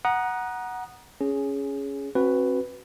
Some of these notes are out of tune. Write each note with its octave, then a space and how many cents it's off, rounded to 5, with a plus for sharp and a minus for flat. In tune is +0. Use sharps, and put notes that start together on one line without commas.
F#5 +0 A#5 +25 D#6 -15
C#4 +5 G#4 +0
C4 +40 F#4 +0 B4 +5